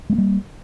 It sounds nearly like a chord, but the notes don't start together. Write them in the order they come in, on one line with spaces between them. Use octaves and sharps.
G#3 B3 A#3 G3